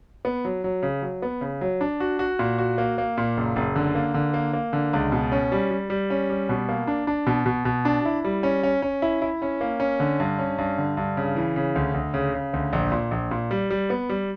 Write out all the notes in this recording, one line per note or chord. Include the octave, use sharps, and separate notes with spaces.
B3
F#3
F#3
C#3
F#3
B3
C#3
F#3
D4
F#4
F#4
A#2
F#4
A#3
A#3
A#2
F#1
F#1
D3
A#3
D3
A#3
A#3
D3
C#2
B2
C#4
G3
G3
G3
C#4
G3
B2
A#3
D4
D4
B2
B2
B2
D4
E4
G3
C#4
C#4
C#4
E4
E4
C#4
A#3
C#4
D3
G2
C#4
G2
D3
G2
C#3
E3
C#3
D2
D2
C#3
C#3
D2
A#1
A#2
A#1
A#2
G3
G3
B3
G3